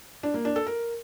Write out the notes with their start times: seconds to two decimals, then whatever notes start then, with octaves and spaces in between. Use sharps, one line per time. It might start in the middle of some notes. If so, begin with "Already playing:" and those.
0.23 D4
0.34 A#3
0.45 D4
0.56 A4
0.67 A#4